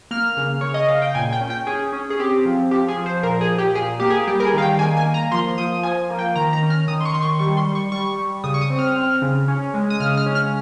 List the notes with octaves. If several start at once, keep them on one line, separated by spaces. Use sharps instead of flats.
A#3 F6
C#3
C#3 C#5
D#5
C#3 F5
G5
A#2 G#5
G5
C#4
G5
C#4 G#4
C#4
G#4
C4 G4
F3
F3 G4
G#4
F3
C5
A#2 A#4
G#4
A#2
G4
A#2 G#4
A#3 G4
G#4
G3 G4
A#4
G#4
D#3 F5
G5
A#3 G#5
G#5
A#3
A#5
F3 C6
F3 D#6
F3 G#5
A#3
G5
D#3 A#5
A#5
C#4
F6
D#3 D#6
C6
C#6
D#3 C6
C#6
G3 C#6
C6
G3
C#6
G3 C#6
G3
C#3 D#6
C#6
D#6
C4
F6
C4
C#3
C#4
G#3
D#6
C#3 F6
F6
C#4
F6